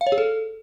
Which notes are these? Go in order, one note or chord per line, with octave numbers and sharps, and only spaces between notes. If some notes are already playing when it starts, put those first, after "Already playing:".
F5
C#5
G#4
A4